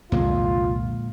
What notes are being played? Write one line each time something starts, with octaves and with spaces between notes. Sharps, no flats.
C2 F2 A#2 D3 G#3 F4